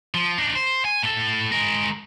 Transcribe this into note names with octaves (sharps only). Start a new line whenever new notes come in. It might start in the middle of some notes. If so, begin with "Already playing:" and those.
F3
D4 D#4
C5
G#5
A2 A4
G#3 A#4